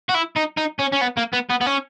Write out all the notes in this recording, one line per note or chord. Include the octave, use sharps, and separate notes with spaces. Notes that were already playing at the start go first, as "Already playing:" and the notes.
F#4
E4
D#4
D#4
C#4
C#4
B3
A#3
B3
B3
B3
C#4